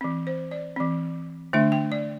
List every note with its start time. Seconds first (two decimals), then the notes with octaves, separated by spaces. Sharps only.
0.01 E3 C4
0.27 C5
0.51 D5
0.76 E3 C4
1.53 D3 A3 D4 E5
1.72 G5
1.92 D5